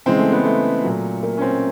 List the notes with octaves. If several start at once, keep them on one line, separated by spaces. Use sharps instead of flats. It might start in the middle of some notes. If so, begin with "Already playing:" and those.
C#3 E3 G#3 C4
A3
B3
A3
A#2 F#3
A#3
C#4
C4